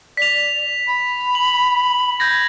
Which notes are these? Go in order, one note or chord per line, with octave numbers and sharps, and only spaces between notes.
D5 B6 F7
B5
F#7
G6 G#6 A#6